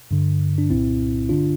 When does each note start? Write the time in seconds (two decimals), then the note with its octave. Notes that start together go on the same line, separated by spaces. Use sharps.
0.11 G2 D3
0.58 D4
0.70 C2 A#2 C4 E4
1.29 G2 D3 D4 F4